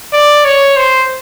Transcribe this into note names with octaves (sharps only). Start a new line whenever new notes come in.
D5
C#5
C5